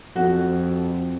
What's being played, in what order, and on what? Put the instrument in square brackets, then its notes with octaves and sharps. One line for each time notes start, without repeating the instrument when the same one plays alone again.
[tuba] F2 [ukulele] F#4